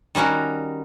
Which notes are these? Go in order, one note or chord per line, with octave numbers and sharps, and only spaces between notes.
D#3 G3 C#4 F#4 A#4